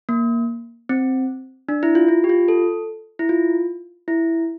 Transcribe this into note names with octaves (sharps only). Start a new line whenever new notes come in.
A#3
C4
D4
E4
F4
F4
G4
F4
A4
E4
F4
E4